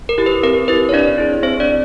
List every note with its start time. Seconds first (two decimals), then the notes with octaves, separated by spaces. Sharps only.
0.09 A#4
0.18 E4 G4
0.26 B4
0.43 C4 A#4
0.68 E4 G4 B4
0.89 C#5
0.92 C4 D4 D5
1.18 E4 G#4
1.43 C4 C5
1.60 D4 D5
1.69 E4